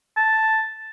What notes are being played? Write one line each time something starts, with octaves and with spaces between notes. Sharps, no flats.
A5